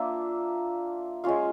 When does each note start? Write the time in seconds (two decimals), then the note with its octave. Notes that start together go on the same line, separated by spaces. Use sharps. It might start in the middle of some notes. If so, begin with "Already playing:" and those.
Already playing: A#3 D4 F4 E5
1.24 G#3 C#4 F4 F5